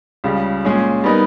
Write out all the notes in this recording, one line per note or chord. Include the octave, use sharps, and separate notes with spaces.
C#2 C#3 G3
A#2 G#3 C#4 G#4
G3 B3 D#4 A#4